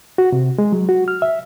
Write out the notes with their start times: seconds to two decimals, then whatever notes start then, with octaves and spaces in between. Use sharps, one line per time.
0.18 F#4
0.32 C3
0.58 G#3
0.72 F#3
0.89 F#4
1.08 F6
1.22 E5